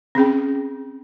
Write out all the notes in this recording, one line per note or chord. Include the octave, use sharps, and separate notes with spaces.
C4 C#4 G#4 G5